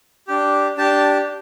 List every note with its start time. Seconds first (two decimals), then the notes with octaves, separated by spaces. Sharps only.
0.28 D4 G4
0.77 D4 G4 A5